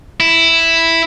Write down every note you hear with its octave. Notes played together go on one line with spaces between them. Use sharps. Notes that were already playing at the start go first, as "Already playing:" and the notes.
E4